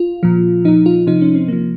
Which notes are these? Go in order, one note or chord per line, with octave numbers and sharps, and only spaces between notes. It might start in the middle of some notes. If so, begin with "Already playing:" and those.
Already playing: F4
A#2 F3
A#2 F3 D#4
F4
C3 F3 D#4
C#4
C4
C3 F3 A#3